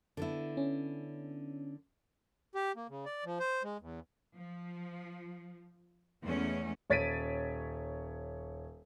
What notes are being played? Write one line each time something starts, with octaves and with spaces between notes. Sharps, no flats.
D3 B3 E4
C#4
G4
A#3
C#3
D5
F3
C5
G#3
E2
F3
E2 G#3 A3 C#4
D#1 C#5 A6 B6 D7 D#7